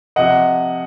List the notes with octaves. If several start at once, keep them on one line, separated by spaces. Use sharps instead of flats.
C3 F3 D#5 F#5